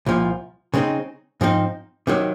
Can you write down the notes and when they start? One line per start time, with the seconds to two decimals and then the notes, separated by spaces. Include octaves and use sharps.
0.06 C2 A#2 F3
0.74 C#3 G#3 C4 D#4
1.41 G#2 F3 C4 D#4
2.07 C3 D#3 F#3